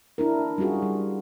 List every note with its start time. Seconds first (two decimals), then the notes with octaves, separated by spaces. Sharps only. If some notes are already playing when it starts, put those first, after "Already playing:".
0.18 D4 E4 A#4
0.58 G3 C#4 F4 F#4 G#4
0.82 G3